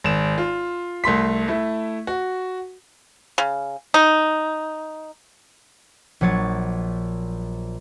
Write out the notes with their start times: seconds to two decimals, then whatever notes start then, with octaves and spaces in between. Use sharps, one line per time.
0.04 G#1 E7
0.38 F4
1.04 C2 A3 C6 B6
1.48 A3 E4
2.07 F#4
3.38 C#3
3.94 D#4
6.21 A#1 F#3 C#5 A6